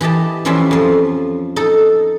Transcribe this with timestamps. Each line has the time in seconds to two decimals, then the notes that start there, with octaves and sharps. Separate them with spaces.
0.01 E3 G4 D#5 A5
0.45 E3 F3 G3 C#4 F4 E5
0.71 F2 F3
1.56 D#4 A4